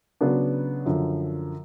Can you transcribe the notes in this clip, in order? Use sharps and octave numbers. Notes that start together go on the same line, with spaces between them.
C#3 F#3 B3 D4
F#2 D3 F3